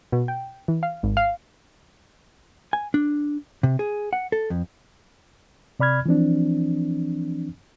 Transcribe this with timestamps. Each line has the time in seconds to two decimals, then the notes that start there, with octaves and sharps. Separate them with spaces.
0.12 B2
0.28 G5
0.68 E3
0.83 F5
1.03 G#1
1.17 F5
2.73 G#5
2.94 D4
3.63 C3
3.79 G#4
4.13 F#5
4.32 A4
4.50 F2
5.80 C3 D5 B5 F6 G#6
6.06 E3 F3 C4 D4